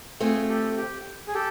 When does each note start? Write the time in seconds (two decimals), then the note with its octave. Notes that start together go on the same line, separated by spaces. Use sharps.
0.20 A3 C4 F4 G#4
0.49 G4 A4
0.77 G4
1.27 G#4
1.34 G4 A4